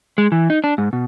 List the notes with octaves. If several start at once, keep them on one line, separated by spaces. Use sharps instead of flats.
G#3
E3
D#4
D4
G#2
B2